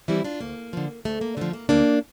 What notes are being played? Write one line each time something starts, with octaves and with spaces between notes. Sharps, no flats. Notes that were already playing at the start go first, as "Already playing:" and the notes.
E3 G3 C4 E4
D4 F4
D2 A#3
D3 F3
D2 A3
A#3
D3 F3 A3
A#3
D2 A#3 D4